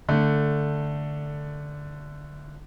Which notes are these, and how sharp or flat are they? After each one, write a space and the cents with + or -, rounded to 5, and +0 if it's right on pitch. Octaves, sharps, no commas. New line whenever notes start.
D3 +0 A3 +5